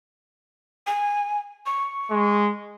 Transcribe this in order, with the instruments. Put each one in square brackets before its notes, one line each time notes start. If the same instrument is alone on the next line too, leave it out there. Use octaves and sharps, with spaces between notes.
[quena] G#5
C#6
[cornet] G#3